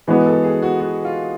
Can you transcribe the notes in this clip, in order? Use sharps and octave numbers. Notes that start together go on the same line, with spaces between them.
E3 G#3 B3 F#4
A4
G#4
F#4
F#4
F4